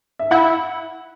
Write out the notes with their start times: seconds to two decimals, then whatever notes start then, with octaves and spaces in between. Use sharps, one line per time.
0.19 E5
0.31 E4 F#5